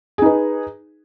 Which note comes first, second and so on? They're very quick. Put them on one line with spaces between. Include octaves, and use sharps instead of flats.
G#4 D#4 B4